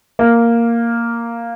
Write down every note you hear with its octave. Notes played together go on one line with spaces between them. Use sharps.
A#3